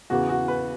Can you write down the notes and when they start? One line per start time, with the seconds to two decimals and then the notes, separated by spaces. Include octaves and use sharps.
0.10 E2 C#3 E3 F#4
0.29 F#4
0.48 B4